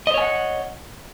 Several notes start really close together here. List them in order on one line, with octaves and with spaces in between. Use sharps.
D#5 C5 C#5 G#5 F#5